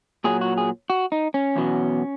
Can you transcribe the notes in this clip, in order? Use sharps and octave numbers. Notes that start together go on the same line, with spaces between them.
A#2 F#3 G#4
F#4
G#4
F#4
D#4
C#4
E2 B2 F#3